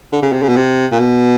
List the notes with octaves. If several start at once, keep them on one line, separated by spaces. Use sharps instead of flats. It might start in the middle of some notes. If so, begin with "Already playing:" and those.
D3
C#3
C3
C#3
B2
C3
A#2
B2